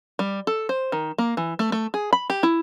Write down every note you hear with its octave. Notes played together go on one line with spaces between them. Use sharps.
G3
A4
C5
D#3
A#3
E3
A3
A3
G#4
B5
G4
E4